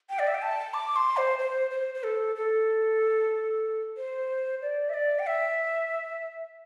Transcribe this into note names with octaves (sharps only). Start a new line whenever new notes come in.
G5
D5
E5
G5
A5
D6
C6
C5
C5
C5
C5
A4
A4
C5
D5
E5
D5
G5
E5